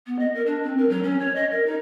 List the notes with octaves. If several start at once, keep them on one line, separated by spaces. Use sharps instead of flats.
B3
D#5
A#4
D4
C4
A#4
F#3
C#4
C#5
D#5
A#4
D#4